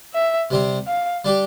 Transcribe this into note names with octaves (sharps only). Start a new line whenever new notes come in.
E5
C3 G3 C4
F5
G3 D4 G4